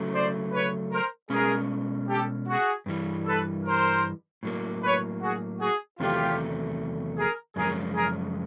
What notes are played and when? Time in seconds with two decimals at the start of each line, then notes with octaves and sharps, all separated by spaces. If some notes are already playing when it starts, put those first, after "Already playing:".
Already playing: C#3 F#3 A3
0.13 C5 D5
0.52 B4 C#5
0.91 A#4 C5
1.30 B2 G#3 C#4 G#4 A#4
2.08 G4 A4
2.47 F#4 G#4
2.86 G2 E3 G3
3.26 A4 B4
3.65 A#4 C5
4.43 A2 F#3 A#3
4.82 B4 C#5
5.21 F#4 G#4
5.60 F#4 G#4
5.99 E2 C3 D#3 F#3 A3 F4 G4
7.17 G#4 A#4
7.56 F#2 C#3 F3 G#3 G#4 A#4
7.95 G#4 A#4